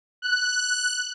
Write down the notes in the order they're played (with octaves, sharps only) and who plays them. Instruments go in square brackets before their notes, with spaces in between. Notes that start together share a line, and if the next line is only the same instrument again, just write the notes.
[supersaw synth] F#6